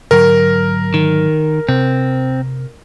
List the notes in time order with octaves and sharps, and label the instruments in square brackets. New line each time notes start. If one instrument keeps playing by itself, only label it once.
[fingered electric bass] G#2 D3 F#3 [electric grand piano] A#4
[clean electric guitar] D#3
[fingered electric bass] C3 [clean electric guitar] C4